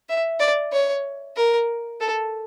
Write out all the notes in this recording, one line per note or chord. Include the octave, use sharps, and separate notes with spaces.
E5
D5
C#5
A#4
A4